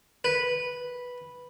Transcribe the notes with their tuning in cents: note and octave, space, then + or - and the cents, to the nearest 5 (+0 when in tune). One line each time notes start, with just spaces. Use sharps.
B4 -5